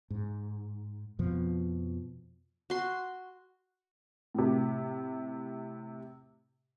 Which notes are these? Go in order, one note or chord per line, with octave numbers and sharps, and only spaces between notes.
G#2
F2 B2 F3
F#4 C6
A2 C3